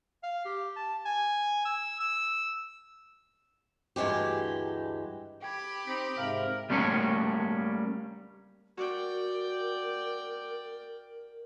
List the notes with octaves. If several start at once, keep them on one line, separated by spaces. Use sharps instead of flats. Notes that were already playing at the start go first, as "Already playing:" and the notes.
F5
G4
A5
G#5
E6
E6
D2 G2 E3 G#3 G4
G4 G5 B5 G#6
C4 D#4 B6
G#2 C3 A#4 F5 D7 F#7
G3 A3 A#3 C#4 C#5
F#4 A#4 D5 G5